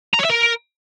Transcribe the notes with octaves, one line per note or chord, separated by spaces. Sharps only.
A#5
C#5
E5
A#4